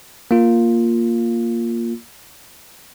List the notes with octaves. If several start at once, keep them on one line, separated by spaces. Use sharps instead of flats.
A#3 F4